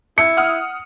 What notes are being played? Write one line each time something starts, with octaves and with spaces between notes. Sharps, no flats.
E4 C#7
F#5 D#6 F6